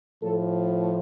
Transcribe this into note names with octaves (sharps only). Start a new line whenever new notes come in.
A2 F3 A4